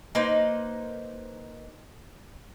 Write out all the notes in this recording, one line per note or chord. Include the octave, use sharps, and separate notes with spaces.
A#3 D#4 B4 C5